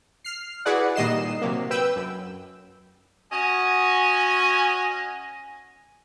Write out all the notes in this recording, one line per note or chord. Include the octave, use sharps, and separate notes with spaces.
F6 C7
E4 F#4 G#4 B4 D5 F#5
A#2 D#3 G3 D#5 C7 E7
C3 F#3 A#3
B4 G5 E6
F#2
C#4 F#4 D#5 G#5